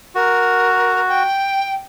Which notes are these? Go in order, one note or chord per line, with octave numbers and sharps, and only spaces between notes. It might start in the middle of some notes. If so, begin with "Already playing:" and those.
F#4 A#4
G5